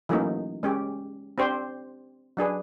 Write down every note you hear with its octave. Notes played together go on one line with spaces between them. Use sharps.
E3 F#3 A3 A#3 C#4 D#4
G#3 C#4 G4
C4 D4 G4 C5
F#3 D4 G#4 B4